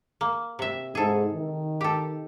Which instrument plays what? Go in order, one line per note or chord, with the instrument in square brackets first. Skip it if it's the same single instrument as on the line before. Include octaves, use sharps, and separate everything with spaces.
[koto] A#3
C3 E5
[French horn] G#2 [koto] G#4 A4
[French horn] D#3
[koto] G4 A4